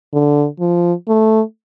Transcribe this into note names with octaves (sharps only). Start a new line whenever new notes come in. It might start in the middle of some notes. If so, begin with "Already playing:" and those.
D3
F3
A3